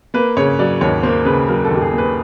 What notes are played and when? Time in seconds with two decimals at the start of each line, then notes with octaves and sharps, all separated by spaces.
0.14 A#3 B4
0.37 C#3 C#5
0.59 F#3 D5
0.81 D#2 C#5
1.03 A#3 C5
1.25 C#3 B4
1.48 F#3 A#4
1.65 A4
1.70 D#2 G4
1.81 G#4
1.93 A#3
1.98 B4